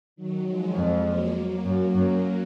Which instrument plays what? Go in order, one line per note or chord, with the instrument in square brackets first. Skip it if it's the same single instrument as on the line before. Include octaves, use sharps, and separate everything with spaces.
[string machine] D#3 F#3
F3 G#3
[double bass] F2
[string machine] F#3 A#3
[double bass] F#2
[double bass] F#2 [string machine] F#3 A#3